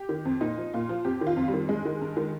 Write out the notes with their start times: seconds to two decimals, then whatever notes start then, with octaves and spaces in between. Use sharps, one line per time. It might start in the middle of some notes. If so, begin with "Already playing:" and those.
Already playing: G4
0.09 D#3
0.25 F2
0.41 A#2 D#4
0.58 F3
0.74 A#2 F4
0.89 F3
1.05 F2 G4
1.21 D#3
1.27 F4
1.36 F2
1.48 G3
1.53 D#3
1.69 G2 G#3
1.85 D#3
2.01 G2
2.17 D#3